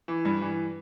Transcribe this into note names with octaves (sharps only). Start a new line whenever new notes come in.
E3
G2
E3